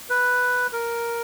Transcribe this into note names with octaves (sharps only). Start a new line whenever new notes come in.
B4
A#4